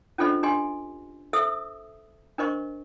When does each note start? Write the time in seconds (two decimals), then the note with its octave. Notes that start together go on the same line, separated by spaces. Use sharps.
0.18 C#4 D4 F4 A4 C5 D#5
0.43 D4 G4 D#5 G#5 C6
1.33 A4 C5 E5 D#6 E6
2.38 D4 A#4 C5 D#5 C#6